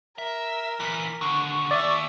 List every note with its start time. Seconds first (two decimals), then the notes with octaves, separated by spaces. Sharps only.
0.18 A#4 E5
0.80 A#2 E3 B6
1.21 D#2 D3 C#6
1.71 D#2 D5 E5